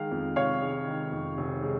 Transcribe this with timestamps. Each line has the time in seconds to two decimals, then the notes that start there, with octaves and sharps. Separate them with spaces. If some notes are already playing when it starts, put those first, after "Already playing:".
Already playing: D#3 G#3 F5
0.11 F2
0.36 F1 C#5 F5
0.62 G#3
0.87 D#3
1.12 F2
1.37 F1
1.63 G#3